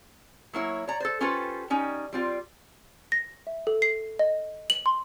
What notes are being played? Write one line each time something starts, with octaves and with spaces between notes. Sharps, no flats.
F#3 A#3 E4 C#5
C#5 D5 A#5
A4 C5
C#4 F4 G4 A4 B4 C5
G3 C#4 D#4
G3 C4 F4
A#6
E5
A4
C7
D#5
F#7
C6